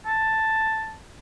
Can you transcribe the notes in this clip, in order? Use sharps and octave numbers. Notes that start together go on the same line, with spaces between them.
A5